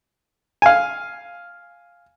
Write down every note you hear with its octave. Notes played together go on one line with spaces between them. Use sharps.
F5 G#5